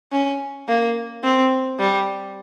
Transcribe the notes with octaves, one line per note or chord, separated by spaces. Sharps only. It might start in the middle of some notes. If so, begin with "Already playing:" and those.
C#4
A#3
C4
G3